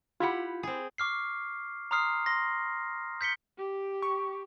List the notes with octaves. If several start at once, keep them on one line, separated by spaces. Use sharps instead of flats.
E4 F4 G4 F#5
C4 G#4
C#6 D6 F6 C7
A#5 C6 D#6 F6 C7
C6 A#6
G6 B6 C#7 G7
G4
C#6